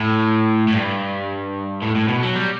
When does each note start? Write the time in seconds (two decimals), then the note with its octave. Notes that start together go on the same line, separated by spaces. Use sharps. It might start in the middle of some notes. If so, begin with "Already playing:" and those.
Already playing: A2
0.68 A2
0.73 G2
1.82 A2
1.95 A2
2.08 B2
2.23 F#3
2.36 G3